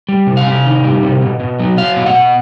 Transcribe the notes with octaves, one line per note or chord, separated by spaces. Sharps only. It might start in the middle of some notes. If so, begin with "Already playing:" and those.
G3
C3
F5
C3
D#3
G3
C3
B2
B2
F#3
F#3 F5
B2
F#5
B2